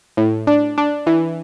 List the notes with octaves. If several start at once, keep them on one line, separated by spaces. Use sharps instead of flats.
A2
D4
D4
E3